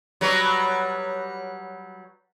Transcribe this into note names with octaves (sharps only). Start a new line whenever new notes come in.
F#3 G3 B4